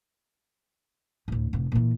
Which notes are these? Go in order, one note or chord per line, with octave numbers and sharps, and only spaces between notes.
D2 A2
F1 A2
A#2 E3